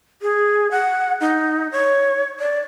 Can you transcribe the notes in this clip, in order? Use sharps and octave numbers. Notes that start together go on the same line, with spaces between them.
G#4
F#5
D#4
C#5
D5